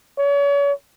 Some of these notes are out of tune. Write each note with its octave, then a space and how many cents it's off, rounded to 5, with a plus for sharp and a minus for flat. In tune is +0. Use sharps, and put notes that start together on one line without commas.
C#5 +40